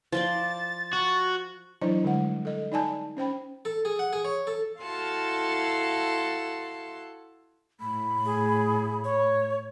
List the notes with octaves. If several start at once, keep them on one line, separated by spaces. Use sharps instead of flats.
F3 F4 D5 A6
F#4
E3 F#3 D4 E4 C5 D#5
D3 G3 G#3 F#5
A4 D#5
D#4 D5 G#5 A5
C#4 C5 G5 B5
A4
G#4
F#5
G#4
C#5
A4
E4 F#4 A4 F5 A5 C6
A2 B5
G#4
C#5